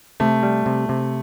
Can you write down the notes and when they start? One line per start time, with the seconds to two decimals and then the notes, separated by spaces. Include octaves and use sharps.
0.20 C3 A3
0.43 G3
0.66 C3
0.89 C3